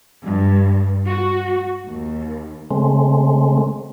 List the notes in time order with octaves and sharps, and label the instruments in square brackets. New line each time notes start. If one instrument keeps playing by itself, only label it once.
[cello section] G2
F#4
D#2
[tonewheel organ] C#3 G#3 A3 C4